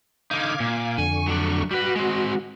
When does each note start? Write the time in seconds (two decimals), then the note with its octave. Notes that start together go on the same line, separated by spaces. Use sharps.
0.31 D3 D#4 F5 D6 G#6
0.60 A#2
0.98 F2 D3 G#5 C#6
1.27 F#3 D4
1.71 G3 F#4 B4
1.96 G#3 C4